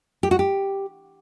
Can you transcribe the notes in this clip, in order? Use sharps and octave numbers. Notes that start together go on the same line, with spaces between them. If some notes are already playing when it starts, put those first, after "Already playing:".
G4
F#4
G4